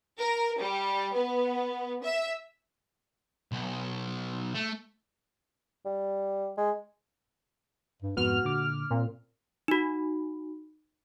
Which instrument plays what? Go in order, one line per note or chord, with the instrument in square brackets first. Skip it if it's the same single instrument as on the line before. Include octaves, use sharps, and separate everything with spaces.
[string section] A#4
G3
B3
E5
[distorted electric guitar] B1
A3
[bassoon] G3
G#3
[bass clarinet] G2
[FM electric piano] F2 G#2 B3 [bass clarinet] F#4 [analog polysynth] F6
[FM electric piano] A#2 D3 D6
[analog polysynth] A#2 [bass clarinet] C4
[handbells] D#4 F#4